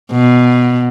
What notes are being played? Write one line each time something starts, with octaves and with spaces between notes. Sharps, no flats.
B2